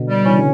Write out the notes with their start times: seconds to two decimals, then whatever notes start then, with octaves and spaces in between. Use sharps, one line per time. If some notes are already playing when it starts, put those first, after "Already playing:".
Already playing: B2 D3
0.09 G3
0.26 C#3 E3 C#4
0.39 D3